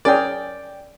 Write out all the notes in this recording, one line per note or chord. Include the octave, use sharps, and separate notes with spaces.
C#4 G#4 A#4 D5 G5